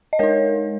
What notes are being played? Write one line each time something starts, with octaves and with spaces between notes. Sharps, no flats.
D#5
G#3 D#4 A#4 C#5